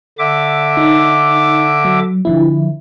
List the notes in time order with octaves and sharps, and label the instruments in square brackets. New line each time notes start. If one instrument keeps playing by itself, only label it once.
[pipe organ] D3 E5 D6
[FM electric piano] D#4
F#3
D3 F3 E4